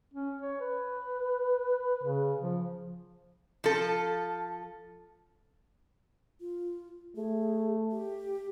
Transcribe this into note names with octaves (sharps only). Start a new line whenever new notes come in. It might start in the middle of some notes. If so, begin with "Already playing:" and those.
C#4
C#5
B4
C#3
F3
F3 A4
F4
A3 G#4
G4